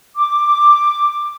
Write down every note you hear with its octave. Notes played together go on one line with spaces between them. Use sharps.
D6